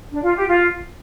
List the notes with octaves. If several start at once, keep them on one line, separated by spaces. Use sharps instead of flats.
D4
F4
G4
F4